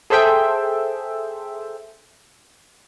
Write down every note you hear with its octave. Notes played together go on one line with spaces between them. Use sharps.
G#4 A4 C5 E5 G5